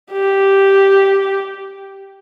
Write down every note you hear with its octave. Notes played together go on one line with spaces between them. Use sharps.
G4